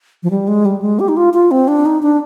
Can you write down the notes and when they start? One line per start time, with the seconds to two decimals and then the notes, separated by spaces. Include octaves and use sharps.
0.23 F3
0.31 G3
0.48 G#3
0.65 G3
0.82 G#3
1.00 G4
1.09 D#4
1.17 F4
1.34 F4
1.51 C4
1.68 D4
1.85 D#4
2.03 D4